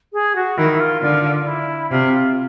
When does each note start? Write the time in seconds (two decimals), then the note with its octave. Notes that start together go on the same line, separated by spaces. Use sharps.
0.13 G#4
0.36 F#4
0.58 D#3 E4
0.72 E4
0.80 F4
1.02 D3 F4
1.25 F4
1.47 E4
1.91 C3 F4
2.14 F4